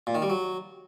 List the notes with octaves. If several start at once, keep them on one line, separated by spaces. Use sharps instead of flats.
A#2
D#3
G3
F#3